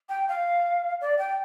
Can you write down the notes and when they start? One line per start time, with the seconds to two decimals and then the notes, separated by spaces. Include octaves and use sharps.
0.09 G5
0.29 F5
1.01 D5
1.19 G5